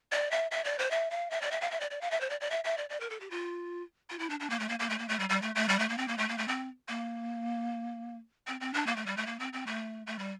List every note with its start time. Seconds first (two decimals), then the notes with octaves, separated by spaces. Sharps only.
0.12 D5
0.31 E5
0.51 E5
0.64 D5
0.79 C5
0.91 E5
1.11 F5
1.30 E5
1.41 D5
1.51 E5
1.61 F5
1.71 E5
1.80 D5
1.90 D5
2.01 F5
2.11 E5
2.20 C5
2.30 D5
2.40 D5
2.50 E5
2.64 E5
2.77 D5
2.89 D5
3.00 A#4
3.10 A4
3.20 G4
3.30 F4
4.10 F4
4.19 E4
4.30 D4
4.40 D4
4.50 A#3
4.59 A3
4.69 A#3
4.79 A#3
4.90 A3
4.99 A#3
5.08 A3
5.19 G3
5.29 G3
5.42 A3
5.55 A3
5.68 G3
5.79 A3
5.89 A#3
5.98 C4
6.08 A#3
6.18 A3
6.29 A#3
6.38 A3
6.48 C4
6.88 A#3
8.47 C4
8.60 C4
8.73 D4
8.86 A#3
8.96 A3
9.06 G3
9.17 A3
9.26 A#3
9.39 C4
9.53 C4
9.66 A3
10.07 A3
10.19 G3